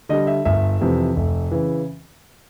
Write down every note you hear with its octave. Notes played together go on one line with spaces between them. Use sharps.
D3 G3 D#5
E5
G1 E5
F2 C3 E3
F1
C#3 E3